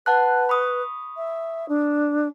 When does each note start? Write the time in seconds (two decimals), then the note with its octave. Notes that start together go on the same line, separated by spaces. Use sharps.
0.06 B4 F#5 A5 F#6
0.49 B5 C#6 D#6
1.17 E5
1.68 D4